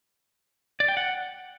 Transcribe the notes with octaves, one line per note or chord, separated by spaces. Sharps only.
D5
G5
F#5